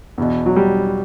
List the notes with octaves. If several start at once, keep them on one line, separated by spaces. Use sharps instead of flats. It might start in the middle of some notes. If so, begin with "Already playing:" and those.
E2 B2
F#3
G3